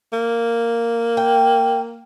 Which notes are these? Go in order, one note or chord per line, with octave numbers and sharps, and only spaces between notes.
A#3
G5